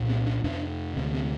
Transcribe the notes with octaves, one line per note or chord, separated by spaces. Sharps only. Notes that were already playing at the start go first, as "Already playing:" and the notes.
Already playing: C2 A#2
C4
D4
F2 C3 D4
D2 C3 C4
C4